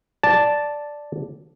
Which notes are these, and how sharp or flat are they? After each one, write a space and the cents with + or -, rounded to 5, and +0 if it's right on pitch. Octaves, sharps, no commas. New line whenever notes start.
D5 +0 A5 +0